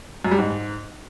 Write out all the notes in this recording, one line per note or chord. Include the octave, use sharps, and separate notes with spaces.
F#2
G3
G#2